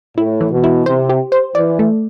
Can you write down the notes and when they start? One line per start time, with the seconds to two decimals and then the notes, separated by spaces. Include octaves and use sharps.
0.16 A2 E4
0.41 E3
0.51 B2
0.64 E4
0.86 C3 C5
1.09 G4
1.32 C5
1.55 E3 D5
1.79 A3